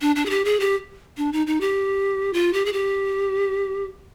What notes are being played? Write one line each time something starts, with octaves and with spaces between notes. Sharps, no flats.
D4
D4
G#4
G4
G#4
G4
D4
D#4
D#4
G4
F4
G4
G#4
G4